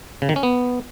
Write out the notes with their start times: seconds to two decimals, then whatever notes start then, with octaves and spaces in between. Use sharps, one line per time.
0.22 C#3
0.29 D#3
0.36 C#4
0.43 B3